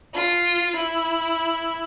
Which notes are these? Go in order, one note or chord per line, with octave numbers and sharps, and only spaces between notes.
F4
E4